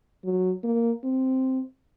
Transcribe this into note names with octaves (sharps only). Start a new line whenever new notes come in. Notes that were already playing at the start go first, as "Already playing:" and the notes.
F#3
A#3
C4